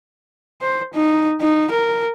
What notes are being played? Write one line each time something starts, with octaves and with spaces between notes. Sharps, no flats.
C5
D#4
D#4
A#4